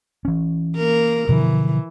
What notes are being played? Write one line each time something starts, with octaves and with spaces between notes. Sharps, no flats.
E3 C#4
A#3 A#4
B2 D3 E3 F3